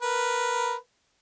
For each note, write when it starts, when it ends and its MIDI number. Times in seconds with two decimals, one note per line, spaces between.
0.02 0.75 70
0.02 0.75 71